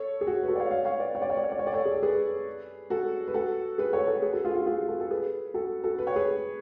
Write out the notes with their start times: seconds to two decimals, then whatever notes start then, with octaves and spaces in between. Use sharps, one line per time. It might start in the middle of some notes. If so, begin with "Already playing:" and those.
Already playing: A4 C#5
0.21 G#4
0.27 F#4
0.43 B4
0.48 F#4 A4
0.55 D5
0.60 C#5 F5
0.70 C#5 F5
0.85 C#5 F5
1.00 B4 D5
1.15 C#5
1.22 D5
1.30 C#5
1.37 D5
1.44 C#5
1.52 D5
1.59 C#5
1.67 D5
1.73 A4 C#5
1.85 G#4
1.94 A4
2.03 G#4 B4
2.90 F#4 A4
3.28 B4
3.34 F#4 A4
3.78 G#4 B4
3.93 A4 C#5
4.07 A4 C#5
4.22 G#4 B4
4.33 F#4 A4
4.44 F4 G#4
4.55 F4
4.66 F4 G#4
4.78 F#4
4.88 F#4 A4
4.99 F#4 A4
5.10 G#4 B4
5.54 F#4 A4
5.84 F#4 A4
5.98 B4
6.07 C#5
6.16 G#4 B4